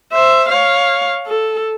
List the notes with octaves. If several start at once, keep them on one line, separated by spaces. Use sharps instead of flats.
C5 E5
C#5 F5
A4